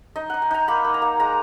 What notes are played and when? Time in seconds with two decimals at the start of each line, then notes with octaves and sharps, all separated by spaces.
0.16 D#4 D#5
0.30 D#4 F#5
0.42 G#5
0.51 D#4 A#5
0.68 A#3 B5
0.85 A#3
0.94 A#5
1.02 A#3
1.20 G#3 A#5